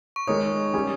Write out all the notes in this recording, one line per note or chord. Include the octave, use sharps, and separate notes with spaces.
C#6
D#3 G#3 D#4 A#4 C#5 D#6
G3 C#4 G#4